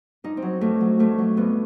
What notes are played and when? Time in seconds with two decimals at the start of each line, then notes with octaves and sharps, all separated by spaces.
0.24 G2 D#4
0.37 C4
0.42 F#3
0.61 G2 A3
0.81 F#3
0.99 G2 A3
1.18 F#3
1.37 G2 B3